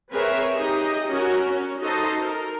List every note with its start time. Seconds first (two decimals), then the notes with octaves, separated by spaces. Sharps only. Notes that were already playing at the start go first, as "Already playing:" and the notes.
0.12 C4 G#4 A#4 B4 C#5 E5
0.56 D#4 G4 G#4 D#5
1.10 C#4 F#4 A#4
1.50 C#4
1.83 D#4 F#4 A4 C5 D#5
2.21 A#4